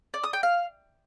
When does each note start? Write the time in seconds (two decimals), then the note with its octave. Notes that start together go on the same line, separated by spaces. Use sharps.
0.14 D5
0.24 D#6
0.33 G5
0.43 F5